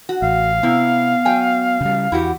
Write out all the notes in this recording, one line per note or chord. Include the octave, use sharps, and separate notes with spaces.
F#4
A1 F5
C3 B3 E4
F#3 G5 G#5
C#3 G3
E2 E4 F#4 G4